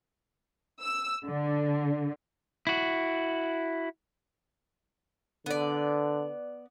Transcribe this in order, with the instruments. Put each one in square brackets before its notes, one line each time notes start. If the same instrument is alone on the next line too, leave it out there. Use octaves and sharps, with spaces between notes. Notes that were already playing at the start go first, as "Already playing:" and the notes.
[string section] E6
D3
[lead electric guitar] E4 F#4
[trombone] D3 [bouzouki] B3 D5